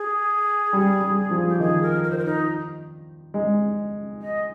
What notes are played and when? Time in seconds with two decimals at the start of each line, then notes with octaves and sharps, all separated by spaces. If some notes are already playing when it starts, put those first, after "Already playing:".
Already playing: G#4
0.73 G3
1.01 G3
1.31 F3
1.49 G4
1.60 D#3 G#4
1.82 A#4
2.03 A#4
2.10 C5
2.18 A#4
2.25 D#4
3.34 G#3
4.21 D#5